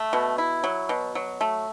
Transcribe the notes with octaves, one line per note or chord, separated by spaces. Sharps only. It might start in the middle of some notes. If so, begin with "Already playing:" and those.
Already playing: A3
B2
E4
F#3
B2
F#3
A3